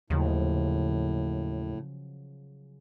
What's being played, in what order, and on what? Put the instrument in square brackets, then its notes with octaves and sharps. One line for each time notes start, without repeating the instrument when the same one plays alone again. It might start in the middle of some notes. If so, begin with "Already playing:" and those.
[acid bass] D#2 [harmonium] A2 [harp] C#3 F3 F#3